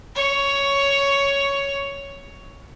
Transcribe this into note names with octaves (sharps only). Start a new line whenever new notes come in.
C#5 C#6